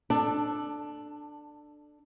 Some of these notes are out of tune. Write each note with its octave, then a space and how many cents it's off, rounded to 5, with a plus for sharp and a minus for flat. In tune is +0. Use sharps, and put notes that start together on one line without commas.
D4 +15 A4 +0